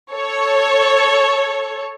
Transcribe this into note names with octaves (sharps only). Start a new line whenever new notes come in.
A4 C#5